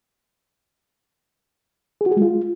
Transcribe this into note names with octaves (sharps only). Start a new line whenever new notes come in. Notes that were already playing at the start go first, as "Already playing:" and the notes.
G#4
F#4
G#4
G#3
F4